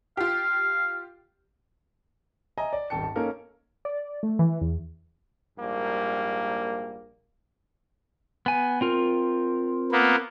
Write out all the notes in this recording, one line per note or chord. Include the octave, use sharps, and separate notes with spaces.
F4 G4 F5
D#5 E5 G#5 A#5
D5
D#1 G#1 G5 A5 C#7
A5
A#3 C#4 D#4 A4 A#4 F5
D5
A3
E3
E2
A#1 G#2 G3 A#3
B3 G#5
C4 F4 A#4
A#3 B3